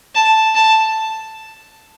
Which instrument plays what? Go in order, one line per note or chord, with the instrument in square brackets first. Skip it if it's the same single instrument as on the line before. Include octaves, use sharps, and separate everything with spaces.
[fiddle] A5
A5